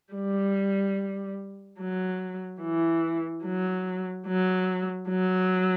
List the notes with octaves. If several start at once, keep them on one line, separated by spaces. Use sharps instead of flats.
G3
F#3
E3
F#3
F#3
F#3